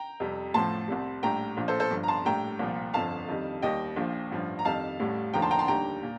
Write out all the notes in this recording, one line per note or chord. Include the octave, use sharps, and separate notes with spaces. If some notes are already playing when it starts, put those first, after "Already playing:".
Already playing: G5 A#5
F2 C3 G3
A1 A2 F3 A5 C6
C2 C3 G3
A#1 A2 G3 G5 A#5
A#1 A#2 F3
A4 C5
A4 C5
G1 G2 F3
A#5
A5 C6
A#1 A2 G3 G5 A#5
C2 A#2 F3
G1 F2 D3 F3 F5 A5
F2 D#3 G3
D#2 D#3 G3 D#5 G5
A#1 A#2 F3
A1 G2 F3
A#5
F2 D#3 G3 F5 A5
A1 A2 G3
F1 D#2 D3 F3 G5 A#5
A5 C6
G5 A#5
A5 C6
D#2 D3 G3 G5 A#5
A#2